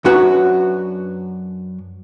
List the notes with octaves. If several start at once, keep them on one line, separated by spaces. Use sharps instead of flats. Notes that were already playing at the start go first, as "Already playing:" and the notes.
F#2 D4 F#4 B4 C#5 A#5